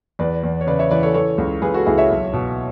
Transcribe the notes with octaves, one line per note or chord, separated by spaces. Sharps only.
E2 B4 D5
E2
C#5
C#3 B4 D5
C#5 E5
E3 B4 D5
A4 C#5
E3 A4 C#5
C#2
C#2 G#4 B4
F#4 A4
C#2 E4 G#4
C#5 E5
B1
B2